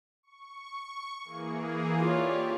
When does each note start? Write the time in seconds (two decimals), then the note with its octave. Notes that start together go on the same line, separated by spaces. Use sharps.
0.23 C#6
1.24 E3 A#3 G#4
2.01 F4 G4 C#5 D5